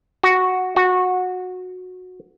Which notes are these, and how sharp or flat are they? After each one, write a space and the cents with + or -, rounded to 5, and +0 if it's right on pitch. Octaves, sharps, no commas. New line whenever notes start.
F#4 +0
F#4 -15